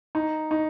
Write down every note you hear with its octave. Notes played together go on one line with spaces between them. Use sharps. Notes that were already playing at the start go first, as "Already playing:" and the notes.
D#4
D#4